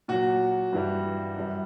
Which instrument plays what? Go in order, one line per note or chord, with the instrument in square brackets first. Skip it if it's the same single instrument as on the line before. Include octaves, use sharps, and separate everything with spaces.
[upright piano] A#2 F#3 F#4
G2 E3 G3
F#2 E3 G3